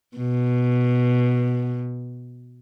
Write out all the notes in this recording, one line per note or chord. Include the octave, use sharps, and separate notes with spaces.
B2